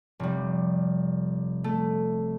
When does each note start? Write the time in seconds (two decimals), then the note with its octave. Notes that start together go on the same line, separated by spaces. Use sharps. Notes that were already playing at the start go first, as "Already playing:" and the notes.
0.20 F1 G3
1.64 A3